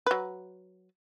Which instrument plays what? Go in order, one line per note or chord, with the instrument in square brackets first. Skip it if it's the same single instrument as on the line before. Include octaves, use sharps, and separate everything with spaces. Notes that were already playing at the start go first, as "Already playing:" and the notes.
[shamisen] F#3 B4